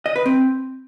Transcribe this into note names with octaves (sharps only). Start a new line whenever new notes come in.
D#5
B4
C4